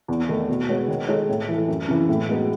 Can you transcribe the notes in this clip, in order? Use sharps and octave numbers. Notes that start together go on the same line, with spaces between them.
E2
D#3 A3
B2
G#3 B3 F#4 C#5
D#3
G#3 D#4 A4 C#5
A2
E3 A3
F#2
C#3 E3
A2
G#3 B3 D#4 F#4